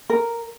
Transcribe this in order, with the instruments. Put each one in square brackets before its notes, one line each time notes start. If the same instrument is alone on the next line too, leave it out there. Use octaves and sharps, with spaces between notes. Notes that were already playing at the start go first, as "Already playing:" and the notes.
[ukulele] A#4